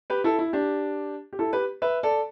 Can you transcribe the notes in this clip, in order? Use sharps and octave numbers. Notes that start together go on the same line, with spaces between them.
G4 B4
E4 A4
E4
D4 G4
G4
E4 A4
G4 B4
B4 E5
A4 D5